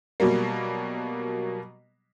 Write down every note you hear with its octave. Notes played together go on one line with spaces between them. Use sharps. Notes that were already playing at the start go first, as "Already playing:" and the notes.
B2 F#3 G3 A#3